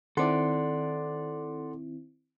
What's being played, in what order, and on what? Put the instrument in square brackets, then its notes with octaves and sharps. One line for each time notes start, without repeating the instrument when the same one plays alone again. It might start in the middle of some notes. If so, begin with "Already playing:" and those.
[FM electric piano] D#3 C4 E4 [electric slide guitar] A4 D5 [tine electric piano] F#5 C6